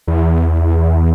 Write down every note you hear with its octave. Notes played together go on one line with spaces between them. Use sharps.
E2